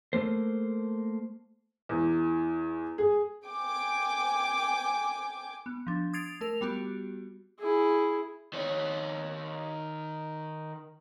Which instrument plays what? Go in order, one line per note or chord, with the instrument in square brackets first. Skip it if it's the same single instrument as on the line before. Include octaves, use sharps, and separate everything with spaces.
[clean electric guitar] A3 A#3 C5
[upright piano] E2
G#4
[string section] G5 G#5 D6
[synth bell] B3
F3 D4
D#6 G#6 A6 C7 D7 F7
A3 A#4 F7
G3 B3 F#4 G4
[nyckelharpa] E4 G#4
[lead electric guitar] D#3 C#5